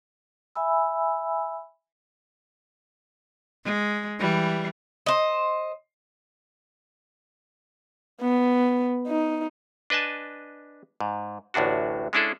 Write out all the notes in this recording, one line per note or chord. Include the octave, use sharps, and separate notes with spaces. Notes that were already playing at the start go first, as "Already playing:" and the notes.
E5 G#5 B5 E6
G#3
E3 G3
C5 D#5
B3
D#4
D4 B4 D#5 G#5 A5
G#2
A1 D2 A2 D4 F#4
G#3 C#4 D4 E4 G#4 A4